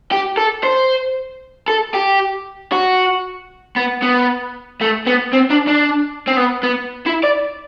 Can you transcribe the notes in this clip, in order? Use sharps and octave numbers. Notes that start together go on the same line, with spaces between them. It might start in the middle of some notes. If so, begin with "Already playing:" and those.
G4
A4
C5
A4
G4
F#4
B3
B3
A3
B3
C4
D4
D4
C4
B3
B3
E4
D5